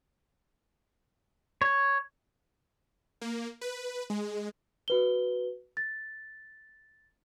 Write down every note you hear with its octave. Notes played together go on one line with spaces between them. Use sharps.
C#5
A#3
B4
G#3
F#4 B4 G7
A6